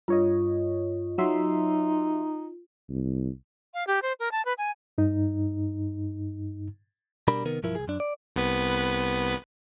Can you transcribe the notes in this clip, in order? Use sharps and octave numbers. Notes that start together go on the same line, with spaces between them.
G2 F4 C#5 D#5
F#3 D#4 E5 C6
C2
F5
G4
C5
A#4
A5
B4
G#5
G2 D#4
B2 G3 D4 A#4 B5
C3 D#3 B3 A#4
B1 G2 F3 E4 A#4
C2 G#4
F#2 D4
D5
C2 B3 B4